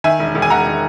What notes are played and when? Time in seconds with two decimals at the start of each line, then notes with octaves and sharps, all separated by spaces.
0.04 D#3 E5 G#5
0.20 E1
0.35 E1
0.42 G#5
0.50 E1 F#5 A#5
0.66 D#3